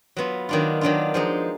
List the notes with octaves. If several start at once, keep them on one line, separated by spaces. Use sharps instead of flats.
F#3 B3 F4
D#3 F#3 D4 F4
D#3 F#3 D4 F4
F3 G#3 D#4